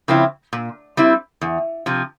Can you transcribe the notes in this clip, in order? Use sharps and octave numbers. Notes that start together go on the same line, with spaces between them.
C#3 F3 C4 E4
A#2
G3 C4 E4
E2
C3 F3